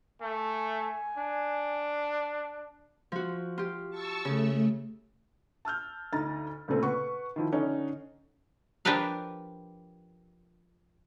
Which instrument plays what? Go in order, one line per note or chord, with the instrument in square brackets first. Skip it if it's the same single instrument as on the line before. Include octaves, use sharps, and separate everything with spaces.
[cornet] A3 [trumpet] G#5
[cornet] D4
[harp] F3 F#4
F4 G4
[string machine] A5 C#6 E6
[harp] C#3 [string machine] A3
[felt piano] A5 E6 F6 G6
D2 D#4 A#5 A6
D2 A#2 C#3 A3 C4
B4 F#5 C#6
D#3 F3 E4
D3 C#4 D#4
[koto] F3 D4 G4 A#4 B4 F5